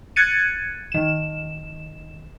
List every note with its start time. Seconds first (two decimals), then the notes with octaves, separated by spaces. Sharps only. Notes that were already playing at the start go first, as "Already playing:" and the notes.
0.16 F#6 G#6 A6 C#7 D#7
0.92 D#3 E7